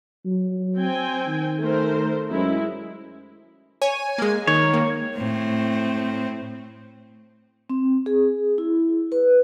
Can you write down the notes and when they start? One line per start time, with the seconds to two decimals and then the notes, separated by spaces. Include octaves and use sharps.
0.25 F#3
0.77 C4 G5 G#5
1.27 D#3
1.61 A3 A#4 C5
2.30 F#2 G#3 E4
3.82 C#5 G#5
4.18 G#3 A#3
4.47 D#3 C#5
4.74 A#3
5.17 A2 C4
7.70 C4
8.06 G#4
8.58 E4
9.12 B4